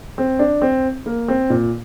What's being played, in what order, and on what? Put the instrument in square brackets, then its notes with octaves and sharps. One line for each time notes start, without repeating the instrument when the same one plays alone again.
[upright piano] C4
D4
C4
A#3
C4
A#2